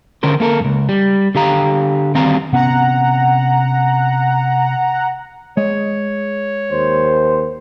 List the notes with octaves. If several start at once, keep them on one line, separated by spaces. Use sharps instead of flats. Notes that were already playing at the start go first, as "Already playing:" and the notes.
D3 C#4 A#4 C5
A#3 A4 A#4
C#2 G2
G3
D3 G4 F5 A#5
D#3 G3 C4 F5 A#5
C3 B3 C#4 F#5 A#5
G#3 C#5 D#5
D#2 C5